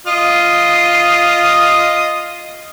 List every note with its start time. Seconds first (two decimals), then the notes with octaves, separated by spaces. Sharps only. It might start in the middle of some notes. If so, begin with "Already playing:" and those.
0.07 F4 D#5 D#6